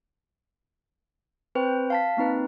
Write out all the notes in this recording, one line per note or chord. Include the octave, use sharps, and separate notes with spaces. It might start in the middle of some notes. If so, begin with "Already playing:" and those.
C4 B4 C5 G5
F5 A5 B6
A#3 C4 D#4 B4